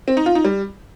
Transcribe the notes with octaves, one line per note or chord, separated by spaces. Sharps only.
C4
D#4
F4
D#4
G3